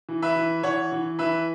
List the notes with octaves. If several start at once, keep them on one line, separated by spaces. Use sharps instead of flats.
E3
B4 E5
E3
E3 C#5 F#5
E3
E3 B4 E5